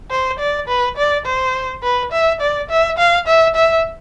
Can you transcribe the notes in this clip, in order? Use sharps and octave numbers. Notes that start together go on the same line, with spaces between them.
C5
D5
B4
D5
C5
B4
E5
D5
E5
F5
E5
E5